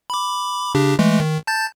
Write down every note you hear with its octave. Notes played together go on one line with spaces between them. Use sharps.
B5 D6
C#3 D4 G4
E3 G#3 A3
D#3
A5 G6 A6